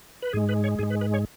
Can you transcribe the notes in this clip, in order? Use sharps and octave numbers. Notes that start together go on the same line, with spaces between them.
B4
G#2 G#3 G#4
B4
C#5
G#2 G#3 G#4
B4
B4
C#5